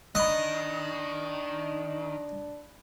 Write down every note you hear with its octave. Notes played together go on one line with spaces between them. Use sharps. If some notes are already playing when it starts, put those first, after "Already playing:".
D#3 D4 D#5 B5 F#6